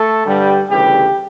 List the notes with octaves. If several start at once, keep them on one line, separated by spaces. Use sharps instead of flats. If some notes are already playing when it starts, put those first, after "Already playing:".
Already playing: A3 A4
G2 D3 G3
D2 C#3 E3 G3 G4